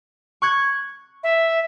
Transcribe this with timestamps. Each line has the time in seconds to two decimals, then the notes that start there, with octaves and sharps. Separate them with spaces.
0.42 C#6 F#6 G#6
1.23 E5